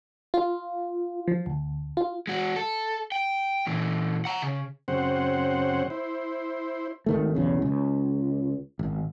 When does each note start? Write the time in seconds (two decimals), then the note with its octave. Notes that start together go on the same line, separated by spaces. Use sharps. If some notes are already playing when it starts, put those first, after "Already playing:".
0.34 F4
1.28 F3
1.46 D2
1.97 F4
2.27 G#3 F#4
2.56 A4
3.12 G5
3.67 A#2 E3
4.25 F#5 A#5
4.42 C#3
4.88 F#2 C#3 C4 C5 F#5
5.90 E4 C5
7.06 G#1 D#3 A3
7.35 B1 E2 C#3
7.62 C#2
8.79 G#1